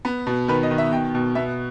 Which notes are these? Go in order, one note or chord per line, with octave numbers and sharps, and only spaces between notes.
B3
B2
D#3 B4
D#5
D#3
E5
B2 G5
B2
B3 E5